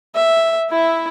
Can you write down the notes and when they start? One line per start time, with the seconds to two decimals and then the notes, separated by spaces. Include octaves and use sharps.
0.15 E5
0.70 E4 E5